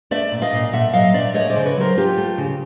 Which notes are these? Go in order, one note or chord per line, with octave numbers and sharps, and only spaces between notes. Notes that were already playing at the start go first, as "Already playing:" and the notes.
A3 D5 E5
A#2
D#5 F5
A#2
A#2 E5 F#5
F#3 D#5 F5
A#2 D5 E5
A3 C#5 D#5
C5 D5
C#3
B4 C#5
F#3 A#4 C5
F#3 F4 G4
A3
C#3